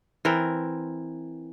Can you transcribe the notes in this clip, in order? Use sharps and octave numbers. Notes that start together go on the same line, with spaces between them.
E3 C4 A#4